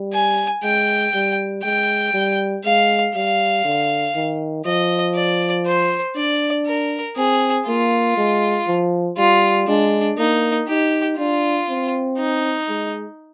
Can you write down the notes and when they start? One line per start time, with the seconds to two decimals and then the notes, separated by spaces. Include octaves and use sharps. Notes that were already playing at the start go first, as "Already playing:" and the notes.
Already playing: G3
0.13 G#5
0.63 G#3 G5
1.14 G3
1.64 G#3 G5
2.14 G3
2.65 G#3 F5
3.15 G3 F5
3.65 D3
4.15 D#3
4.65 F3 D#5
5.16 D5
5.66 C5
6.16 D4 D5
6.67 A#4
7.17 C4 G#4
7.67 A#3 F4
8.17 G#3
8.67 F3
9.18 G3 F4
9.68 G#3 D4
10.18 A#3 D#4
10.68 D#4 G4
11.19 D4 F4
11.69 C4
12.19 D#4
12.69 G#3